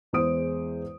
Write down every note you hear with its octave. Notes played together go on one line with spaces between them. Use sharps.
E2 G#3 G#4 C5 D#6 D7